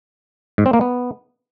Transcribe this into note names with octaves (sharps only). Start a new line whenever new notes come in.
G#2
C4
A#3
B3